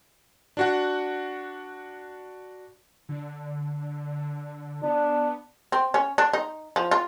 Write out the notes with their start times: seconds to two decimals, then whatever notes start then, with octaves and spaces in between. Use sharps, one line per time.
0.57 D4 F#4 F#5
3.09 D3
4.83 B3 D4
5.72 C4
5.94 C#4
6.18 D4
6.33 D#4
6.76 F3
6.91 F4